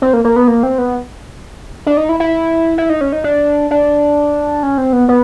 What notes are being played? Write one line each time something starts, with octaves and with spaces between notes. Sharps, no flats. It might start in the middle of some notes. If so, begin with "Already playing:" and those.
C4
A#3
A#3
B3
A#3
C4
B3
D4
D#4
E4
E4
E4
D#4
C#4
D#4
D4
D4
C#4
C4
B3
B3